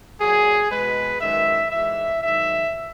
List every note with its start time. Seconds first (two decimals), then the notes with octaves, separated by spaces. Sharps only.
0.21 A#2 F#3 G#4
0.71 B2 G#3 B4
1.21 F#2 D#3 G#3 E5
1.71 G#2 E3 G#3 E5
2.22 G#2 D#3 F#3 E5